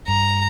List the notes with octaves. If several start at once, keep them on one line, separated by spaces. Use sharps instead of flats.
G2 A#5